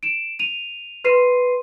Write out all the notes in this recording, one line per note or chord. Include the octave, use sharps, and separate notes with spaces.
D7 E7
D#7 F7
B4 C6 C7 D#7